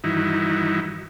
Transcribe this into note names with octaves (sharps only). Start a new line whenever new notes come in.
G2 D#3 E3 D#4 E4 F#4